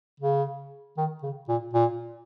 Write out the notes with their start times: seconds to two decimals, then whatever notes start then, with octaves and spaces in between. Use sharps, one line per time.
0.20 C#3
0.97 D#3
1.23 C#3
1.48 A#2
1.73 A#2